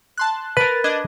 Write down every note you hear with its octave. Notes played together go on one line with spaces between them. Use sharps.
A5 C6 F#6
A#4 B4 A6
D4 D#5 G#6